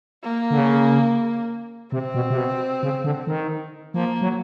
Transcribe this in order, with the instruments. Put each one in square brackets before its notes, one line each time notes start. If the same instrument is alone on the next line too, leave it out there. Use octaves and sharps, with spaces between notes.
[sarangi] A#3
[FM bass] D3
C#3
[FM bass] C3 [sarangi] C4
[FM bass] B2
C3
B2
C#3
D3
D#3
[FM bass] F3 [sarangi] A#3
[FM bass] F#3